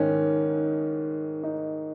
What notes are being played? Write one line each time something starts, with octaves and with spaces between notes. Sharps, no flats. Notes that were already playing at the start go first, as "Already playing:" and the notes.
Already playing: G#2 D#3 C#4
D#4